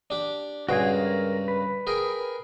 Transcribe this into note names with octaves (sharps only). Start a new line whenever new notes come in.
D4 G4
C#2 G2 F#4 G#4 G5 G#5
A#4
B4
G#4 A#4 G5